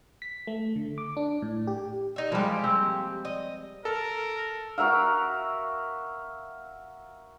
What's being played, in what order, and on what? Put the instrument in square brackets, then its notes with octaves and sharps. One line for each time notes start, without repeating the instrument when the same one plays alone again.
[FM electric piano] B6
A3
D3
D6
D4
A2
G4
[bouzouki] D#4 E5
[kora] F3 G3 G#3 [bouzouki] A#3 G4
[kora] C4
[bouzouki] D#5
[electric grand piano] A4 [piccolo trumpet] A#4
[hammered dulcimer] F#4 A#4 E5 F5